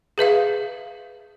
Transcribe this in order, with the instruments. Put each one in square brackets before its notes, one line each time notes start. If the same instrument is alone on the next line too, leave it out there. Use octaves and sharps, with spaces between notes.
[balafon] G#4 B4 E5 F5